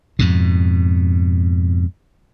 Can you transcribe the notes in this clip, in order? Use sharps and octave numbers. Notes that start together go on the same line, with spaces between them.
F2 G#2 B2